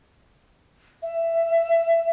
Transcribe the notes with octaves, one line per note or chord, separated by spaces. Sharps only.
E5